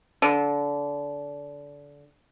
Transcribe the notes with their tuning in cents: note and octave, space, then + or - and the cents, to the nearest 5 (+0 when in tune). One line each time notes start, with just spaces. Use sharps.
D3 -25